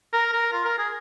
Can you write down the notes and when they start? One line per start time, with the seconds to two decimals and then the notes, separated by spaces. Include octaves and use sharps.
0.13 A#4
0.33 A#4
0.53 F4
0.65 A#4
0.78 G#4